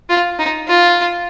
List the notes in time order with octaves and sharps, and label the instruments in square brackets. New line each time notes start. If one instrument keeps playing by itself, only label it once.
[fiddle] F4
D#4
F4